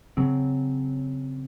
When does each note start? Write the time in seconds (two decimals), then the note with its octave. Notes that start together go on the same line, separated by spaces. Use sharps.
0.17 C#3 F#3 C4